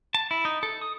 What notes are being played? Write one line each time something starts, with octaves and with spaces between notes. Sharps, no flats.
A5
E4
D#4
A4
D#6